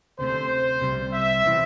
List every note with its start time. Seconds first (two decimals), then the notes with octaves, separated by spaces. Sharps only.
0.19 D2 C3 A3 C5
0.81 C2 C3 G3
1.12 E5
1.45 C3 E3 C4